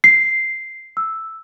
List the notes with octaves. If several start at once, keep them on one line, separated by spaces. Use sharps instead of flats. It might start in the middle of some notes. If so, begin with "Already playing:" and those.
C7
E6